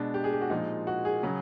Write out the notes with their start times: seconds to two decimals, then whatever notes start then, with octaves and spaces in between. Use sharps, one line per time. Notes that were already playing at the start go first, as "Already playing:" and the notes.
Already playing: B2 G#3 D4
0.14 G4
0.24 G#4
0.32 G4
0.41 F#4
0.50 A#2 F3 G#3 D#4
0.87 F#4
1.05 G#4
1.23 C#3 F#3